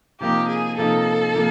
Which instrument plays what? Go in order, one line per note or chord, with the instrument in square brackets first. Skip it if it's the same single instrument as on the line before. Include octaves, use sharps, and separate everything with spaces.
[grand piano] C3 F3 A#3 D#4 [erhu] G4
[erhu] G#4
[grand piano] C3 F3 A#3 D#4 [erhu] A4
[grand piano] C3 F3 A#3